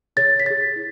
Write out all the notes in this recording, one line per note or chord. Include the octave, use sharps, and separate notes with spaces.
G#4 C#5 A6
B6
G#4 C#5 A6
E4